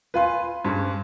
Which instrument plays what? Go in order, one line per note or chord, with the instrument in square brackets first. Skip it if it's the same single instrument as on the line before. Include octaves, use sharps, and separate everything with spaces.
[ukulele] F4 F5 G#5 [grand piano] B4 C6
[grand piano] G2 [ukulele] C#4 G#4 C5